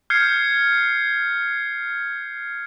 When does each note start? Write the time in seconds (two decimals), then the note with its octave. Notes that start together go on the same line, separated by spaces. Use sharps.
0.10 F6 G6 G#6 C7 C#7